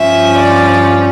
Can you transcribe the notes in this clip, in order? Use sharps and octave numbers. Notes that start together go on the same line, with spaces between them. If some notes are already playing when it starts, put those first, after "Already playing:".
Already playing: G2 F3 C#4 E5
D5